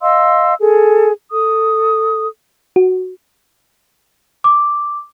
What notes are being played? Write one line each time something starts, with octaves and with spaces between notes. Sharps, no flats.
D#5 F5 C6 E6
G#4 A4
A4 D#6
F#4
D6